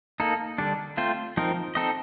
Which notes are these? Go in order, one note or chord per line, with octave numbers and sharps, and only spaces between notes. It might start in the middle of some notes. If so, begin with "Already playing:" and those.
A#3 D#4 A4
D3 G3 D4
A3 C4 F4 C5
F3 C4 D#4 A#4
C4 D#4 A4 D#5